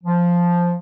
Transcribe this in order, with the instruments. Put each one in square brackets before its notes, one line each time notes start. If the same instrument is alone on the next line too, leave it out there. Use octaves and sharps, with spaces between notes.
[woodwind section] F3